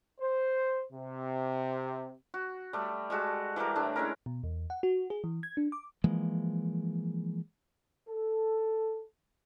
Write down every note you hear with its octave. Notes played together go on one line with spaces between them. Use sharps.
C5
C3
F#4
G3 A3
G3 G#3 F#4 A4
E3 G3 G4 A#4
A2 A3 D4
G#3 C#4 E4 A#4
B2
E2
F#5
F#4
G#4
E3
G#6
D4
D6
E3 F3 G#3 A#3
A4